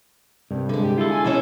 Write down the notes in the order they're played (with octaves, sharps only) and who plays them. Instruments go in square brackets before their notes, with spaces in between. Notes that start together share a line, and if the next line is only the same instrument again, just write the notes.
[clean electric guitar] C2 [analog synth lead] G2
[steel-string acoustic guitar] D3 G#3
[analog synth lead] G4
[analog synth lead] E4 [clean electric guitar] F4 A4
[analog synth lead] G#5
[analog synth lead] B2 [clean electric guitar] E3 A4 [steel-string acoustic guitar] C#4 D#4 E4